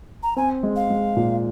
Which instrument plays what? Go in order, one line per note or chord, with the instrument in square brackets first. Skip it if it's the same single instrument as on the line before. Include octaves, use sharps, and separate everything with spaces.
[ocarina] A#5
[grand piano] C4 [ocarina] G#5
[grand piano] G#3
[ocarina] F5
[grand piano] G#3
A#2